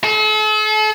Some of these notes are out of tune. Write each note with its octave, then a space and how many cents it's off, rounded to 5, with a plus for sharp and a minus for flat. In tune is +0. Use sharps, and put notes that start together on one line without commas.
A4 -40